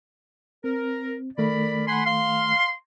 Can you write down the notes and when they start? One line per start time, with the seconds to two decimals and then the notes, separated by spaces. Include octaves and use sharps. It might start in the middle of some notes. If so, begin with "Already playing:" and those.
0.64 C4 A#4
1.38 D#3 A3 A#4 D5 B5
1.87 F#5 G#5 B5 C6
2.06 F5 C6